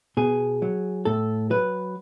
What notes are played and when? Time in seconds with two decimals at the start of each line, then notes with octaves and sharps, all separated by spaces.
0.17 B2 G#4
0.62 F#3
1.05 A2 A4
1.50 F#3 B4